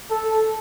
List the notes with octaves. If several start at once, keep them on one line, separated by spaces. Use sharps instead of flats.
A4